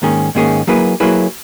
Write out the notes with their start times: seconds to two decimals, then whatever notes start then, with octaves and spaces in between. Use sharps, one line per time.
0.02 G#2 D#3 A#3 C#4 G#4
0.35 G#2 D#3 A#3 C#4 G#4
0.67 F#3 A#3 E4 G#4 B4
1.00 F#3 A#3 E4 G#4 B4